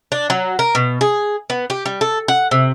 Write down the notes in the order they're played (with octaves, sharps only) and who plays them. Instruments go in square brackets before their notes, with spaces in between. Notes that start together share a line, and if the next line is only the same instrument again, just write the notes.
[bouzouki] D4
F#3
A#4
B2
G#4
B3
G4
G3
A4
F#5
C3